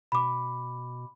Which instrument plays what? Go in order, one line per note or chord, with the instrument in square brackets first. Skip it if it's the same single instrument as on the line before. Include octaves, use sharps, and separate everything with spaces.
[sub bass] B2 [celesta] B5 D6